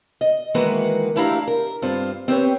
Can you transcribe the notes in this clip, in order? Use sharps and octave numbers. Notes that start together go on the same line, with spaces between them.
D#5
D#3 E3 G#3 A#3 F#4 B4
A3 D4 E4 G4 F5 A#5
A#4
G2 C4 F4
C4 G4 B4 C#5